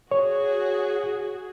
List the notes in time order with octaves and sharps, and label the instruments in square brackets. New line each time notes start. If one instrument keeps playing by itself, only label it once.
[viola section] F#4 G#4 [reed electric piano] C#5